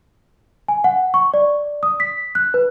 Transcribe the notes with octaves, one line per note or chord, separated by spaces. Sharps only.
G#5
F#5
C#6
D5
D#6
B6
F#6
B4